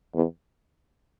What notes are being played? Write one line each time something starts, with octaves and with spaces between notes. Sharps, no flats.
E2